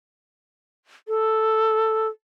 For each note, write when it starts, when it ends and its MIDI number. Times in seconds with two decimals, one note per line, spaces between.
1.08 2.08 69